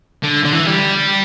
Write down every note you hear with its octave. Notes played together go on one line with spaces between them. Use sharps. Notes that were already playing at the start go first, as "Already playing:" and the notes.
D3
D3
E3
G3